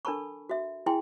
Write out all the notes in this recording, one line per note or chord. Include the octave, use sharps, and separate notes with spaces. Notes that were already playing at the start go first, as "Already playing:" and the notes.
D4 A4 A#4 A5 B5 C#6
F#4 E5
E4 G#4 G5 G#5 C6